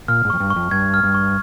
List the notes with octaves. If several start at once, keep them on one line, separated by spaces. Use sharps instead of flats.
A#2 F6
G#2
F2 C#6
G2
C#6
F2
G2 G#6
F6
G2
C#6